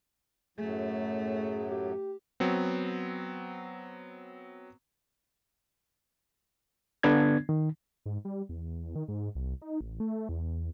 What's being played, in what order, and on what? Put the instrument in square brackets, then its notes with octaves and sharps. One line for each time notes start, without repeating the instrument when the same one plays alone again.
[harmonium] F#2 A2 F#3 [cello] A3 [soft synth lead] G#4
[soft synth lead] G4
[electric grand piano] F#3 B3 C4
[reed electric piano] D3 B3 D4 G#6
D#3
[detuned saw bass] G#2
G3
E2
D#3
G#2
C2
D#4
A1
A3
E2